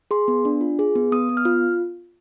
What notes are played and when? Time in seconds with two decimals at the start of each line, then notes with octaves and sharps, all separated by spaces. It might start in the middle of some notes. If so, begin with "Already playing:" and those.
0.11 G#4 C6
0.28 B3
0.45 D4
0.61 F4
0.79 G#4
0.95 B3
1.12 B3 D#6
1.29 B3
1.37 F6
1.45 F4